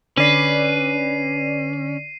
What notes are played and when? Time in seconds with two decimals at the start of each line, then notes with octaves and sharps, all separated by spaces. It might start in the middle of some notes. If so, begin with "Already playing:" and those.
0.18 D3 C#4 B4 D5 C7 D#7